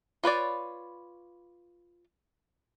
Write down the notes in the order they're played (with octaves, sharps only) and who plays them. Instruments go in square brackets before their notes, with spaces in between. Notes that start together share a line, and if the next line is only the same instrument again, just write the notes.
[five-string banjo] F4 B4 C#5 D5